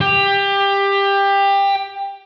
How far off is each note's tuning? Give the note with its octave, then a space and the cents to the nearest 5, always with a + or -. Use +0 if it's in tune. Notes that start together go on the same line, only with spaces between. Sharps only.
G4 +20